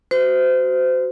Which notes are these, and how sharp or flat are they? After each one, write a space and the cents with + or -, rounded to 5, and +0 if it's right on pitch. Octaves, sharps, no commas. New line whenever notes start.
F#4 +10 C5 -30